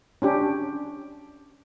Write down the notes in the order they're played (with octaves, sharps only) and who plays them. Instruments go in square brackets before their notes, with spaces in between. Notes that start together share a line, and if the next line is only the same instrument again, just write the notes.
[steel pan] C#4 D4 G4